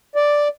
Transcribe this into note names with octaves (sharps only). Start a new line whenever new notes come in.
D5